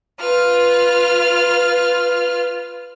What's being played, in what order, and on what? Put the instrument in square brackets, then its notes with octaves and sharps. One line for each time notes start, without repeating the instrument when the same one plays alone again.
[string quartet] F4 B4 F6